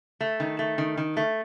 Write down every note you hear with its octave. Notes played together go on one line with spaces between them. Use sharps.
A3
D#3
A3
D#3
D#3
A3